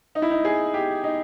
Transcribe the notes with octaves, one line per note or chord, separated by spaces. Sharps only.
D#4
E4
D#4
G#4
G4
D#4